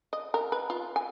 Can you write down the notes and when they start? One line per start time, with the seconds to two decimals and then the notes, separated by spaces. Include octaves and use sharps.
0.13 D#5
0.34 A#4
0.52 B4
0.70 F4
0.96 G#5